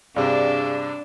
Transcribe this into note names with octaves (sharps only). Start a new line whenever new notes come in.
G2 C3 D4 G#4 D5 F5